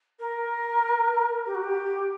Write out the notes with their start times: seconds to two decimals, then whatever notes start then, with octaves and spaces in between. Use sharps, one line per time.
0.20 A#4
1.46 G4
1.55 F#4
1.64 G4